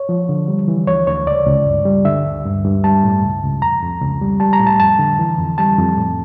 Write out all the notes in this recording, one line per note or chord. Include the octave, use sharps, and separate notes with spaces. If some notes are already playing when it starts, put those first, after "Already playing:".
Already playing: C#5
F3
D3
G3
E3
D2 C#5
D2 C#5
C#2 D5
C#2
G2
G3
D3 E5
D2
G2
G2
G3 A5
A2
C#2
C#2
F2 A#5
F2
C#2
G3
G3 A5
A#5
A2
A5
F2 A5
D3
E3
F2
G3 A5
F2
A2